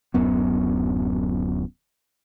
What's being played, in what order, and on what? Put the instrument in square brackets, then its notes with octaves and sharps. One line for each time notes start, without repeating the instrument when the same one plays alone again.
[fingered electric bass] D1 F#2 B3